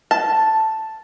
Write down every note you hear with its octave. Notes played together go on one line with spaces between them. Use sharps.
A5